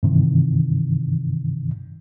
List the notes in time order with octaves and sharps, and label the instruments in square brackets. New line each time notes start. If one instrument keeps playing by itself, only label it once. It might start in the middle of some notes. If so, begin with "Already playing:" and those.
[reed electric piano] G2 C3 D#3 E3